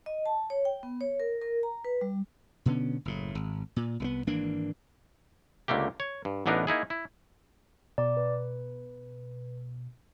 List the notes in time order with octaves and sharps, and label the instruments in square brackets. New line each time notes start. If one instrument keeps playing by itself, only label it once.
[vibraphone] D#5
A5
C#5
G5
B3
C#5
A#4
A#4
A#5
B4
G3
[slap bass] B2 D3 B3 C#4
F#1 A2
G#1
A#2
C2 G#3 B3
G#1 E3 A#3 D4
[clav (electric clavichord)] C#2 D3 A3 A#3 G4
C#5
G2
A1 E3 B3 D4 D#4 A#4
A#3 D#4 E4 G#4
E4
[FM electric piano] B2 [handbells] D5 D6
[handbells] B4